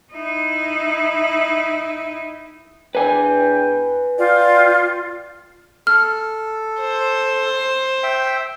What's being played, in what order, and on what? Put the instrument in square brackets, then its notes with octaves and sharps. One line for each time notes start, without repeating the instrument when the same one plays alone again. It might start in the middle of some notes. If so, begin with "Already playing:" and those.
[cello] D#4 E4
[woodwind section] E2 D4 G5 [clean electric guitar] B4 G#5
[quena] F4 [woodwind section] D5 G5
[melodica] A4 [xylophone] F6
[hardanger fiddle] C5
[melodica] E5 G5